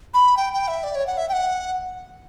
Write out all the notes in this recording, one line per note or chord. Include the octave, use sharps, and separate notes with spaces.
B5
G5
G5
E5
D5
C#5
F#5
E5
G5
F#5